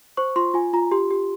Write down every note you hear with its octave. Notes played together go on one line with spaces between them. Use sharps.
C5 C#6
F4 C6
F4 G#5
F4 A#5
G4 C6
G4